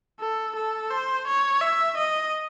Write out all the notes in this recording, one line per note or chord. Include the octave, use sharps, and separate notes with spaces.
A4
A4
C5
C#5
E5
D#5